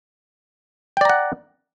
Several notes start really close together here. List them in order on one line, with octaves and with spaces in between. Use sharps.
G5 D5 A#5 F#5